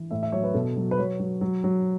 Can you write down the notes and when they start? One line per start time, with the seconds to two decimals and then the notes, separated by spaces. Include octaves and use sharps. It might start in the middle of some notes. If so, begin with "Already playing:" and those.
Already playing: E3
0.11 A2 E5
0.23 E5
0.32 F#3 C#5
0.44 B4
0.54 B2 A4
0.77 F#3
0.91 B4
0.98 F#3 C#5
1.20 F#3
1.41 F#3
1.64 F#3